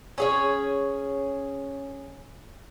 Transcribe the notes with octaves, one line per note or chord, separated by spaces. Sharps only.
C#4 G#4 C#5